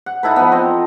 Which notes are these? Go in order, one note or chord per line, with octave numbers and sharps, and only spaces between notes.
F#5
D#4 E4 A4 B4
F3 B3
C4 D#5